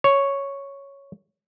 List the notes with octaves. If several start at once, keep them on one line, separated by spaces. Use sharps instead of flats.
C#5